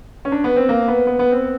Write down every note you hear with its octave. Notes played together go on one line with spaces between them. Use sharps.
C#4
D4
B3
C4
A#3
B3
B3
B3
C4